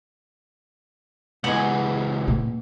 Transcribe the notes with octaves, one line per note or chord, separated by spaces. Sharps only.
C#2 E3 G#3 B3 F#5
A#2